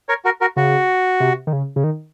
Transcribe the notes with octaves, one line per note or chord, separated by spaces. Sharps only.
A#4 C#5
F#4 A#4
F#4 A#4
C#3 F#4
C3
D#3
C#3
C#3
D#3